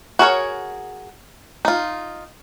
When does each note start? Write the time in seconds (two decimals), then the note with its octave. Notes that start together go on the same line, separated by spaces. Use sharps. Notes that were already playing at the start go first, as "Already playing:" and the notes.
0.19 F#4 G#4 A#4 C#5
1.65 D#4 F4